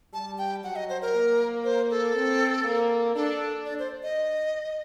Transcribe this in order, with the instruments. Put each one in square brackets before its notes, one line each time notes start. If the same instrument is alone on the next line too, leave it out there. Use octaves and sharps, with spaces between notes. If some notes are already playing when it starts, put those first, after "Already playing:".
[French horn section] G3 [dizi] A5
[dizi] G5
[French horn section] F#3 [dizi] F#5
[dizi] D#5
C5
A#4
[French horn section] A#3
[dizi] C5
A4
[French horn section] C4
A#3
[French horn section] D4 [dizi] A4
[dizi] D5
C5
D#5